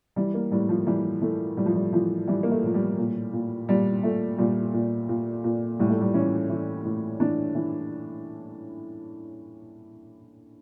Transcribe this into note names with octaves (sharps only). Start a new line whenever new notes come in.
E3 G3
A#3
A2 G3
F3
E3 G3
E3 A3
A2 G3
F3
G3
E3 F3
E3 G3
A#3
A3
A2 F3
G3
A#2
A#2
A#2 G3
A#2 A3
A#2 G3
A#2
A#2
A#2
A2 G3
A3
G3
E3 C#4
E3
A2
E3 D4
E3